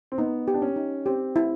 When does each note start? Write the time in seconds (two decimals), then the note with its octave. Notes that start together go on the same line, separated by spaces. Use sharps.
0.12 C4
0.18 B3 D#4
0.48 G4
0.54 D4
0.62 C#4
0.76 D#4
1.06 C4 G4
1.36 E4